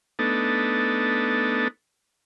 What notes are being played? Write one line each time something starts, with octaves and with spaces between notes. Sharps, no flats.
A3 B3 D4 D#4 A4